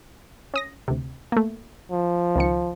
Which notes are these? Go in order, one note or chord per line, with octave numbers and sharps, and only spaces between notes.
C#4 D#6 A#6
D2 C3
A3 A#3
F3
C#2 D#3 C#7